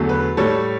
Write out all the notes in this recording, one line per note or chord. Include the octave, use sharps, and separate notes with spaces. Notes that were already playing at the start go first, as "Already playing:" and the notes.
Already playing: E2 D3 F#3 A3
B4
A2 G3 A4 C#5